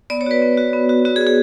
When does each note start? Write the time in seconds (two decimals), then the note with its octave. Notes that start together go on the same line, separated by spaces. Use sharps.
0.10 B3 D5
0.21 C#5
0.26 F#4 B4
0.42 B3
0.57 F#4
0.73 B3
0.89 F#4
1.05 B3 F#4
1.16 G#4
1.21 F#4
1.27 G#4